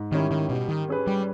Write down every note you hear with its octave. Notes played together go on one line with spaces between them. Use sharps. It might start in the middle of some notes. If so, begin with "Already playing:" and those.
Already playing: G#2
D#3 G3 C#4 E4
D#3
B2 G3
D#3
C#4 G#4 B4
G3